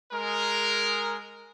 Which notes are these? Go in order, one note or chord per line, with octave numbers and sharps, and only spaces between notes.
G#3 A#4